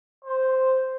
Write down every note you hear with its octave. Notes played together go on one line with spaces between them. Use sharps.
C5